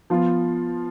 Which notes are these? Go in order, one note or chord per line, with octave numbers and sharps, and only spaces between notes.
F3 B3 F4